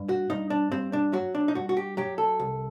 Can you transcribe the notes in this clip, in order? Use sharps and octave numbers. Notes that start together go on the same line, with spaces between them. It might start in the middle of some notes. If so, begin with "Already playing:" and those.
Already playing: G2
F#4
G2 D#4
D4
G2 C4
D4
F#3 F#4
D4
D#4
G2 F#4
F#4
G4
F#3 G4
A4
C2